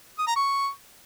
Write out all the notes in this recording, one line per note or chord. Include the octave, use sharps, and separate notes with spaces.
D#6
A#5
C#6